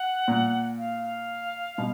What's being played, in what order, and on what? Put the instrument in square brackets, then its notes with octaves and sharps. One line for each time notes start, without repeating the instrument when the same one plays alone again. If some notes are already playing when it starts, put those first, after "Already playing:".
Already playing: [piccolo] F#5
[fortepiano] A#2
[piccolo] F5
F5
[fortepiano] B2